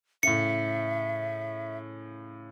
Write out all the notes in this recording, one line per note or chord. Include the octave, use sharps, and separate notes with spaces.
A2 C#3 E5 C#7